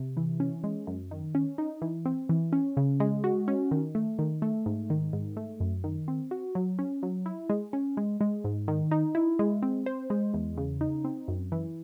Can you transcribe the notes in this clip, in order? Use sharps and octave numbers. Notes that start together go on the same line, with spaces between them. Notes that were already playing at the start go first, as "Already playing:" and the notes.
Already playing: C3
E3
C#4
G#3
F#2
D#3
C#4
D#4
E3
C4
E3
C#4
C#3
G#3
F#4
C#4
D#3
A3
D#3
A3
G#2
D#3
G#2
A3
F#2
D#3
C4
F#4
F#3
C#4
F#3
E4
G#3
C#4
G#3
G#3
G#2
D#3
D#4
E4
G#3
C4
C5
G#3
E2
C#3
D#4
C4
F#2
E3